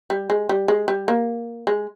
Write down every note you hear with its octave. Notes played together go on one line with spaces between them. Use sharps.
G3
G#3
G3
G#3
G3
A#3
G#3